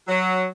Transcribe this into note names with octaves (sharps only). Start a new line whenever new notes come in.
F#3